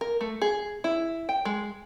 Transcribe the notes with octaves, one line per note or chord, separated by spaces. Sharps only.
A#4
A3
G#4
E4
G5
G#3